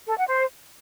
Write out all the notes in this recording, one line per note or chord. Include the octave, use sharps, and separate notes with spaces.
A4
F#5
C5